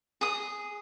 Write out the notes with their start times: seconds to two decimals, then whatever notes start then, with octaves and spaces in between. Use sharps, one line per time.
0.21 G#4 D#6